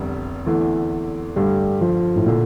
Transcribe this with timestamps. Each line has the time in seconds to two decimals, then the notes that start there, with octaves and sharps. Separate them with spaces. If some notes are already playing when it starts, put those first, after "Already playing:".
Already playing: F1 E2 D3 G3 D4
0.46 E2 D3 E3 A3
1.36 G2 D3 G3 A3
1.81 F3
2.16 A2
2.26 A#2 D3 A3